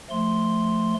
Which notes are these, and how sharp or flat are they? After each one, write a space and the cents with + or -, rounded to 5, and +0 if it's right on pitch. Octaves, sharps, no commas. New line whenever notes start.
F3 +0 A3 +0 C6 +0